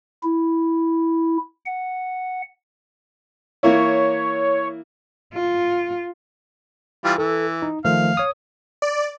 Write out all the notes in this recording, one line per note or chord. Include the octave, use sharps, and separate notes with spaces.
E4
F#5
E3 A#3 E4 C#5
F4
E3 G3 F4
E3 A4
D#4
D#3 F3 A3 F5
C#5 D#6
D5